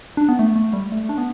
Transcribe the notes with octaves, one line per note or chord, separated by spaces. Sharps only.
D4
B3
A3
A3
G3
A3
D4
B3